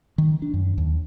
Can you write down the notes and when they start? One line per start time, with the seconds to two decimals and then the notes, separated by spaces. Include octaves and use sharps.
0.18 D#3
0.42 D4
0.54 F#2
0.78 D#2